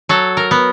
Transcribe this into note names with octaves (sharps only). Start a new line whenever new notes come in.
F#3 A4
A#4
B3